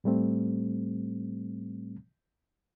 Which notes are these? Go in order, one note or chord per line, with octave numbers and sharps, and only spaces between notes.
A2 G3 A3 C4